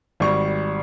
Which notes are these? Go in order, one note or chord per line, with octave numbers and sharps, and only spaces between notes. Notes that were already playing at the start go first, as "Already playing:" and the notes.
G#1 G3 C#6